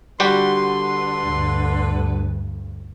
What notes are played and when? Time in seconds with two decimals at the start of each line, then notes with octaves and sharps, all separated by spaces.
0.20 D3 G3 F#4 G4 B4 C6
1.22 D2 G2